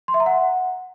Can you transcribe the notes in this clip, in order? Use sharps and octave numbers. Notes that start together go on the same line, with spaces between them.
C6
E5
A#5
F#5